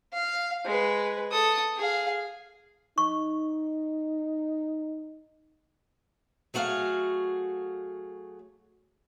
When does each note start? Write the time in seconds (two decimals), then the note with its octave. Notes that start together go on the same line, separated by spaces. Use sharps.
0.13 F5
0.65 G#3 B4
1.32 A4 D#6
1.78 G#4 F5
2.98 D#4 C#6
6.54 F#3 A3 F#4 G#4 F5